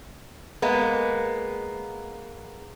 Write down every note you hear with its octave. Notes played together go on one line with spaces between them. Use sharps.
G#3 A#3 B3